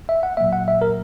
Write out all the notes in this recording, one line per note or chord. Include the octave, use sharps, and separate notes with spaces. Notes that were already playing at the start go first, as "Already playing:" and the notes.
E5
F#5
A#2 F#3 A#3 E5
F#5
E5
A#4